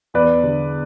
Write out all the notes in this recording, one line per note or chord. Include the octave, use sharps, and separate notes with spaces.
E2 B4 D5
D3 G3